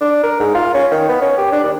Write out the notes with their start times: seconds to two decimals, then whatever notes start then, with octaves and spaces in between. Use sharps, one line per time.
0.01 D4
0.23 A#4
0.40 G#2
0.55 F4
0.74 C#4
0.91 D#3
1.09 B3
1.22 C#4
1.38 G4
1.52 D4
1.64 D#2